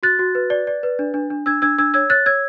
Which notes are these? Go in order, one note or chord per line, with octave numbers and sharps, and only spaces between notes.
F#4 F#6 A6
F#4
B4
D5
D5
B4
D4
D4
D4
D4 E6 G#6
D4 E6 G#6
D4 E6 G#6
C#5 E6 G#6
C#5 F#6 A6
C#5 E6 G#6